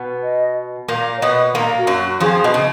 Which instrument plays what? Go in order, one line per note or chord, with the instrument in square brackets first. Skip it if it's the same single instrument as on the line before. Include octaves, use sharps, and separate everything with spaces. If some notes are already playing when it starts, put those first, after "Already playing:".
Already playing: [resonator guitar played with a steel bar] B2 B3
[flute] D#5
[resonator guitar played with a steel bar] A#2 A#3 [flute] F5
[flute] C#5
[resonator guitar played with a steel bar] B2 B3 [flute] D#5
[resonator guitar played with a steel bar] A#2 A#3 [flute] A#4
[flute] F#4
[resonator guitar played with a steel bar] F#2 F#3
[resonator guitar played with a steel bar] F2 F3 [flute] G#4
[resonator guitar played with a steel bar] B2 [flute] D#5
[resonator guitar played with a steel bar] C#3